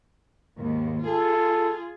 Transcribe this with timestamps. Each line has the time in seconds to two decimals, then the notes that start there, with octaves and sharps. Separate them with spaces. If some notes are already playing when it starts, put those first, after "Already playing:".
0.57 D#2 G#2
1.06 F4 G#4 A4